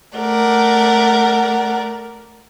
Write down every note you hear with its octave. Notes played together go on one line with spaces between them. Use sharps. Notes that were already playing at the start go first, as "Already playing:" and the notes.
A3 A#4 D5 F#5